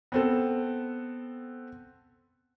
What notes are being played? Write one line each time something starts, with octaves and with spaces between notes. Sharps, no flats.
B3 C4 A4